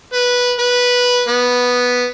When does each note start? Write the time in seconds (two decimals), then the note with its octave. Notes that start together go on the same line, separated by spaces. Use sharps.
0.13 B4
0.59 B4
1.28 B3